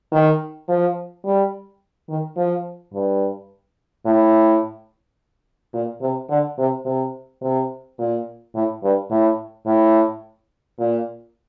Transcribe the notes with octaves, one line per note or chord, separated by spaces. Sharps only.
D#3
F3
G3
D#3
F3
G2
A2
A#2
C3
D3
C3
C3
C3
A#2
A2
G2
A2
A2
A#2